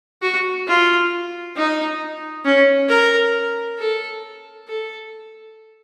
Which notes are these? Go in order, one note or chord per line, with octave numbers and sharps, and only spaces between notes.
F#4
F4
D#4
C#4
A#4
A4
A4